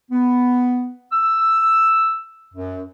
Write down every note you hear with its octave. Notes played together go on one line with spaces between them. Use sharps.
B3
E6
F#2